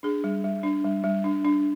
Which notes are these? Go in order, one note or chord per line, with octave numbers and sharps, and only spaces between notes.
D4 G#4
G3
G3
D4
G3
G3
D4
D4